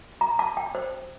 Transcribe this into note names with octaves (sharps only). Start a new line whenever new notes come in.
A#5
A5
G5
C5